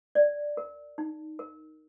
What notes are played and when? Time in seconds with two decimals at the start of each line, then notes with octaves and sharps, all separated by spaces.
0.15 D5
0.57 A#4
0.98 D#4
1.39 A#4